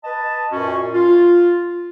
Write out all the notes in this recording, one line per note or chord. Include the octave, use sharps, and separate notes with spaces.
B4 D#5 A5
F#2 A#2 C#4 F#4
F4